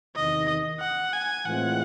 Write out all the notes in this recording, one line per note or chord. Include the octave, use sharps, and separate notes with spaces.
E2 C3 D#3 D#5
F#5
G#5
A2 E3 G#3 C4 F4 F#5